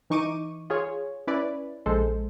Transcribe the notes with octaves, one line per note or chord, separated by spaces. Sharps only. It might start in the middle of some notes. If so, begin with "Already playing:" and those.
E3 D#4 C#6 D6 D#7
F4 G#4 C#5
C#4 E4 B4 D5
A#1 G#3 A4 C5